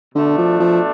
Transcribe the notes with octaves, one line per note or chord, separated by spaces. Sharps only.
B2 D3 A3 D4
F3
F3